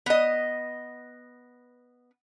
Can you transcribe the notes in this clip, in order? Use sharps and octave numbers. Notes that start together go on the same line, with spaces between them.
B3 D#5